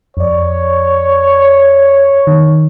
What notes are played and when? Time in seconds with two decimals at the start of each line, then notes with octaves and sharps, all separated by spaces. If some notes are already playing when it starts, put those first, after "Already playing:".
0.17 F2 C#5 D5
2.27 D#3